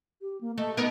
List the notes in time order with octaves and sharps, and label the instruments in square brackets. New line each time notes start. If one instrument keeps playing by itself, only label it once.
[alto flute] G4
A#3
[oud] A3 [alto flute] D#5
[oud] B3 D#4 A#4